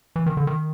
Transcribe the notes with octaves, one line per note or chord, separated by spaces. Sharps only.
E3
D#3
D3
D#3